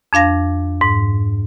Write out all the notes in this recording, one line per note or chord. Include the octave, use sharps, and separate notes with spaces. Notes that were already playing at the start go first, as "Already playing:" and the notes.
F2 D4 F5 A#6
G#2